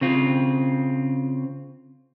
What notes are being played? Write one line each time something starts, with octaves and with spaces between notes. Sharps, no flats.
C#3 C4 F4